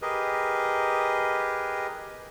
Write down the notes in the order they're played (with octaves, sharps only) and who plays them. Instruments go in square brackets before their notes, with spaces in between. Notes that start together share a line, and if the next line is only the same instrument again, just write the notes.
[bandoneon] G4 G#4 A#4 B4 D#5